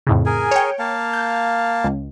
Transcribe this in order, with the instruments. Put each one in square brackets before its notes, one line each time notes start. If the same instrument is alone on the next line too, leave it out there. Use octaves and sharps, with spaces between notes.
[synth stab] F2 A2 C#3
[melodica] G#4 A#4 G#5
[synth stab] C#5 G5
[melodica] A#3 F5 A5
[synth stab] G6
C#2